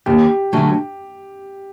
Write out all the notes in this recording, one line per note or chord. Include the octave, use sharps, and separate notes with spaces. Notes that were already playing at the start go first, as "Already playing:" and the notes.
D#2 G4
D3 F#3 A3 C#4